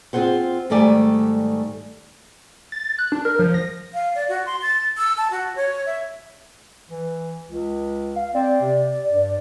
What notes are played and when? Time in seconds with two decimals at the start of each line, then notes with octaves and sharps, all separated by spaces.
0.13 C4 F4 G#4 C5 F#5
0.70 G#2 D#3 G3 A3 D5 G#5
2.72 A6
2.99 F#6
3.12 D4
3.25 A#4
3.39 F3
3.54 A#6
3.94 F5
4.15 D5
4.29 F#4
4.46 C6
4.62 A6
4.97 E6
5.17 A5
5.31 F#4
5.56 C#5
5.86 E5
6.90 E3
7.49 C#2
8.16 F5
8.35 C4 D5
8.61 C3
9.08 G2